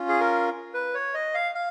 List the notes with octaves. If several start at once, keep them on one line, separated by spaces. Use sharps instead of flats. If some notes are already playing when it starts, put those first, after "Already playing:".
Already playing: C#4 F4
G#4
A#4
B4
C#5
D#5
F5
F5